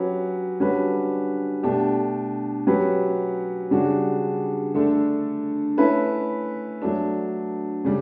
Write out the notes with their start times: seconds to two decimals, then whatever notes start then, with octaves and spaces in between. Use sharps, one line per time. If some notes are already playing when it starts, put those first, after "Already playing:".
Already playing: F#3 C#4 G4 B4
0.60 D3 G3 C#4 F#4 B4
1.63 B2 A3 D4 G4
2.67 F#3 C#4 G4 B4
3.71 C#3 G3 D4 F#4
4.74 D3 A3 D4 A4
5.77 A3 C#4 E4 B4
6.82 F#3 A3 D4
7.85 C#3 G3